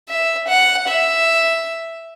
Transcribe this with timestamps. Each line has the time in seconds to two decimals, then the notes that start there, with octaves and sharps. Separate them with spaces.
0.09 E5
0.48 F#5
0.88 E5